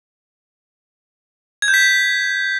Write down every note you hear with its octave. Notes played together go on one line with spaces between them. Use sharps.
G#6
G6
B6